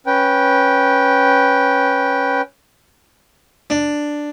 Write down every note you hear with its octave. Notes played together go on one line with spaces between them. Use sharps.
C#4 B4 G5
D4